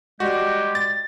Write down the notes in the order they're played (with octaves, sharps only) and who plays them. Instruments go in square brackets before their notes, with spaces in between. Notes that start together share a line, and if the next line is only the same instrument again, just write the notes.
[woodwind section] G3 G#3 G4 [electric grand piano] F#4
[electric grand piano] A6